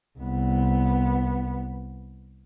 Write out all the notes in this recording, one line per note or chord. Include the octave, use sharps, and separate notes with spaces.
C2 B3